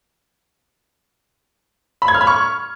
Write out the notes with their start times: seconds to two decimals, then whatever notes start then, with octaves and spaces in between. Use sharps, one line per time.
2.02 B5
2.08 G#6
2.14 F6
2.21 B5
2.27 C#6